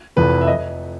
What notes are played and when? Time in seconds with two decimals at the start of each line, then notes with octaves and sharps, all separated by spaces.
0.16 F1 F2 C3 E3 B4
0.41 E5
0.47 D#5